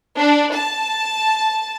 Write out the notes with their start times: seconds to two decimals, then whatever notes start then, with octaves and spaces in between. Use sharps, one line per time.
0.18 D4
0.55 A5